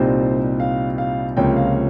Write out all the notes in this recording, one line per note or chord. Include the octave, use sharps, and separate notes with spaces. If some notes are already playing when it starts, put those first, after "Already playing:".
Already playing: C2 A#2 G3 C4 D#4 C5
F5
F5
C#2 C3 F3 A#3 C#4 G5
F5